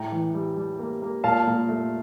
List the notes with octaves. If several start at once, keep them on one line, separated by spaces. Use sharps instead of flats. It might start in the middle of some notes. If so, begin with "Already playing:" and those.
Already playing: A2 G5 A#5
E3
G3
G3
A#3
A#3
A#2 F5 A5
A#2
A3